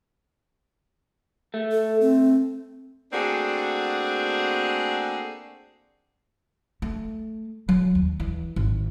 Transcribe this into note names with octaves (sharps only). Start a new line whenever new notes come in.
A3
A4
C4
A3 A#3 C4 D4 F#4 G#4
A3
F#3
D#2
E3
G#1